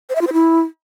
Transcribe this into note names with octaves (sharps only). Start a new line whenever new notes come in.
C5
E5
F4
C5
E4